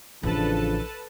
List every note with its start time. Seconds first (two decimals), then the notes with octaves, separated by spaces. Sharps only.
0.23 A1 C#3 E3 F3 D4 A4 B4 A5